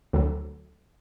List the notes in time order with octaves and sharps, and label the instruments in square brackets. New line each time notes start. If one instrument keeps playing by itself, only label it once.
[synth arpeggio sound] D2 D3 F#3